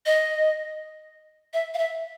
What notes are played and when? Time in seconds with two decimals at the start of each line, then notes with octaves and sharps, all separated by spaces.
0.06 D#5
1.54 E5
1.74 F5
1.78 E5